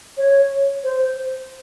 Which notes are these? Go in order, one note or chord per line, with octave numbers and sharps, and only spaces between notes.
C#5
C5